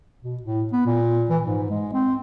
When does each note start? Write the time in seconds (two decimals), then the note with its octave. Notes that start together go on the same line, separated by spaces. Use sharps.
0.23 B2
0.43 A2
0.73 B3
0.86 A#2
1.30 E3
1.43 G#2
1.70 G#3
1.93 C4